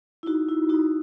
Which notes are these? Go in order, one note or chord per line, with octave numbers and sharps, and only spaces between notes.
E4
D#4 F#4
E4
D#4 F#4